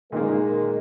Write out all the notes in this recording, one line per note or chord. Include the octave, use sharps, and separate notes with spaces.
A#2 D#3 G#3 A#3 A#4